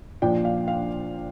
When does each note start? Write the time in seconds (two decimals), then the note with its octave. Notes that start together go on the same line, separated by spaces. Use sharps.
0.22 A#2 F3 D4 F4 G5
0.45 F5
0.68 F5